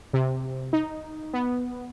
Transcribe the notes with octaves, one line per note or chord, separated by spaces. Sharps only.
C3
D#4
B3